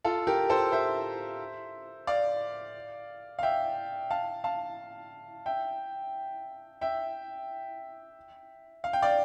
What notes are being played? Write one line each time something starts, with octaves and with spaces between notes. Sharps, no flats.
F4 A4
G4 A#4
A4 C5
C5 E5
D5 F5
F5
E5 G5
F5 A5
F5 A5
E5 G5
E5 G5
F5
G5
D5 F5